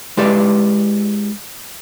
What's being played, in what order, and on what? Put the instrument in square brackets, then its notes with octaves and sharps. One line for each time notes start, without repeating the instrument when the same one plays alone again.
[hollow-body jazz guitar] G#3 E4 G4 B4 D5